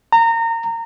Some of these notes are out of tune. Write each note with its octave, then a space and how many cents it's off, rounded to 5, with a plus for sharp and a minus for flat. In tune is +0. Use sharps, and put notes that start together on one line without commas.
A#5 -25